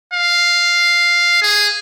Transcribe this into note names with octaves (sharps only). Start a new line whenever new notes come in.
F5
G#4